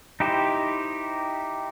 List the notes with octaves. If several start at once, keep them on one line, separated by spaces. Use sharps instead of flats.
D#4 E4 G4 C5